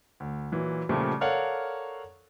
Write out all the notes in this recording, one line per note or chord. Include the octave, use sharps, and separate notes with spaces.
D2
A#2 E3 F#3
A#2 C#3 F3 G3 A3
A4 A#4 C#5 D5 F5 F#5